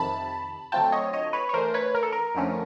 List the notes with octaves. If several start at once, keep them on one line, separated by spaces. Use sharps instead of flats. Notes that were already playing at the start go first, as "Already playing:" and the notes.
Already playing: F2 C3 D#3 A5 B5
D3 F#3 A3 C4 F4 G5 A5
C#5 D#5
C#5 D#5
B4 C#5
C#5
E3 A3 D4 A#4 C5
B4 C#5
A#4
A4
A#4
F2 D3 F3 A3 C#4